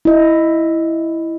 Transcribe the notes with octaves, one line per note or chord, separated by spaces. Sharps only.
E4 D#5